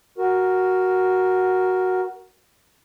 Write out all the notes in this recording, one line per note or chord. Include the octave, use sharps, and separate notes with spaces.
F#4 A#4